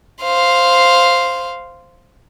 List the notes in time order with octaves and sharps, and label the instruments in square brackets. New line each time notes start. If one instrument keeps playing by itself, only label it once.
[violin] C5 F5